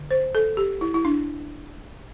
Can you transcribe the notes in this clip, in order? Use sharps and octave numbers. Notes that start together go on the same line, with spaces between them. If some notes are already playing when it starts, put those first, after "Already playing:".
Already playing: D3
C5
A4
G4
E4
E4
D4